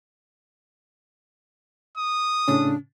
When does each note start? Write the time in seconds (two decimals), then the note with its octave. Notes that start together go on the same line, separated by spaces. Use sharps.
1.98 D#6
2.48 A2 C#3 C#4 D4